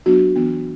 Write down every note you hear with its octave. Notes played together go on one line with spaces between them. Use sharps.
F#3 B3 D4 F#4
E3 B3 D4